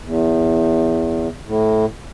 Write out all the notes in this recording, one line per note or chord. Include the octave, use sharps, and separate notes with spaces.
E2
A2